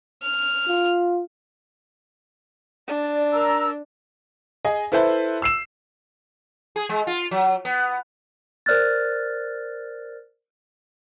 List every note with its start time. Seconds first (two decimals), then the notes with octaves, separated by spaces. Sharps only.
0.23 F6
0.67 F4
2.88 D4 D5
3.32 A#4 A#5 E6
4.65 G#4 D#5 G#5
4.92 E4 A4 B4 C5 E5 A5
5.42 E6 C7 E7
6.76 G#4
6.89 G#3
7.07 F4
7.31 F#3
7.65 B3
8.66 A#4 C5 D5 F6 F#6 A6